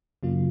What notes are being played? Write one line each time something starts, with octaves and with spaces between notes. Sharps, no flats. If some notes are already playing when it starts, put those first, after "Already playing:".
F#2 C#3 F#3 A#3 F4